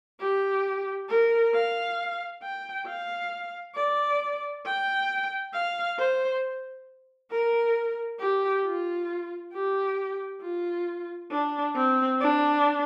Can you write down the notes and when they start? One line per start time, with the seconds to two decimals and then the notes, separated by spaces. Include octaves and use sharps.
0.20 G4
1.09 A#4
1.54 F5
2.42 G5
2.87 F5
3.75 D5
4.65 G5
5.53 F5
5.98 C5
7.31 A#4
8.20 G4
8.65 F4
9.53 G4
10.42 F4
11.31 D4
11.75 C4
12.21 D4